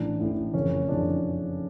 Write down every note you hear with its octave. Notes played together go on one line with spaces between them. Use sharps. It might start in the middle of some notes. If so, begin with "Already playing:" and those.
Already playing: A1 A2 E3 D4
A1 A2 E3
F#1 F2 C#3 E3 C#4
F#1 F2 C#3 E3 D4